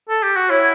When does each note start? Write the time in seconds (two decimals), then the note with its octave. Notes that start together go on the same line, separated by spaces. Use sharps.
0.09 A4
0.23 G4
0.36 F#4
0.50 E4 C#5